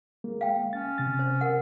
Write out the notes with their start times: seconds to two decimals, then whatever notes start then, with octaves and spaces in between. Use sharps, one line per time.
0.24 G#3 A#3
0.41 F5 G5
0.73 C#4 A6
0.98 C3 A6
1.19 C5
1.41 A#4 F#5